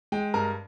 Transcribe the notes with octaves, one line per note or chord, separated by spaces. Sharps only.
G#3 G5
G2 A#4